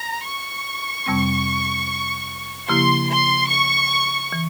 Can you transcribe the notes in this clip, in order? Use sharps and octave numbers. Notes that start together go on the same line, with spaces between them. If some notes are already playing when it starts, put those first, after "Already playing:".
Already playing: A#5
C#6
F2 C3 G3 C4
C#3 F3 A#3 E4 G4 C6
C6
C#6
E3